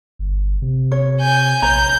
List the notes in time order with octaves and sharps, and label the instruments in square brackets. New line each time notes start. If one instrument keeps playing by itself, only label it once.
[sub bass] G1
C3
[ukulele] C#5
[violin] G#5 G6
[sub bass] A#1 [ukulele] B4 C#5 A#5 [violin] G6